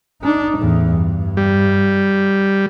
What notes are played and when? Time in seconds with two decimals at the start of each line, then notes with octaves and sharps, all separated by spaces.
0.22 D4 D#4
0.58 E2 A2
0.92 G2
1.37 G3